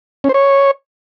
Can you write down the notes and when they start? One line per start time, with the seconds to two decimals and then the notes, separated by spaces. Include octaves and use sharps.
0.24 C#4
0.29 C5
0.34 C#5